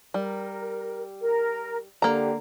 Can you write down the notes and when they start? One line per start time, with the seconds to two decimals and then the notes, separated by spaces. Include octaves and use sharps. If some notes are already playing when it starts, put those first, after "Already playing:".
0.14 G3 A#4
1.21 A#4
2.02 D3 A#3 G4 A#5